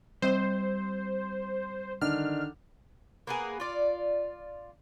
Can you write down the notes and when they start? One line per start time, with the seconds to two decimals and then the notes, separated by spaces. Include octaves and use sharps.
0.22 G3 C4 C5 D#5
2.01 D3 D#3 D4 F6
3.27 A#3 B3 G#4
3.60 F4 D5